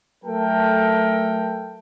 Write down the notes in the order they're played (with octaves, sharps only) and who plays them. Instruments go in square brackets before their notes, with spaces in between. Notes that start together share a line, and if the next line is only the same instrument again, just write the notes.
[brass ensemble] F#3 A3 A4 A#4 G5